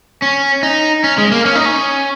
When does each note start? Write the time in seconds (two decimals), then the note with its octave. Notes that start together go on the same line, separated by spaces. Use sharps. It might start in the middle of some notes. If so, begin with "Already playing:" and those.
0.22 C#4
0.63 D#4
1.04 C#4
1.18 G#3
1.32 A#3
1.46 C#4
1.55 D#4
1.66 C#4